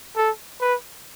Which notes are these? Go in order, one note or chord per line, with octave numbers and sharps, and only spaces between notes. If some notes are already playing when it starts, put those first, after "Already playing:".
A4
B4